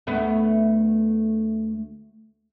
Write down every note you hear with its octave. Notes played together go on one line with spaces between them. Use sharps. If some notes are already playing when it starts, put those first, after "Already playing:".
D2 A3 B3